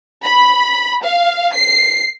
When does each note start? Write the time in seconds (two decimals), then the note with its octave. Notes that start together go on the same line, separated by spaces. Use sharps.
0.24 B5
1.04 F5
1.54 C7